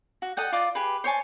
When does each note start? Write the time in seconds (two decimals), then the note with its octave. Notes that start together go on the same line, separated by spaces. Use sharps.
0.22 F#4
0.37 A4 D#5 F#5 G5
0.52 F4 D5 D#5 D6
0.75 G4 G#4 B4
1.04 C5 C#5 G#5 A5